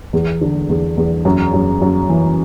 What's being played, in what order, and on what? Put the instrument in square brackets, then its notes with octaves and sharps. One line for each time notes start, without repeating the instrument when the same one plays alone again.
[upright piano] E2
D3
E2
E2
F#2
F#2
F#2
E3